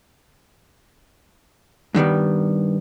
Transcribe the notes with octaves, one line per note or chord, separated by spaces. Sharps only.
G2 D#3 G3 B3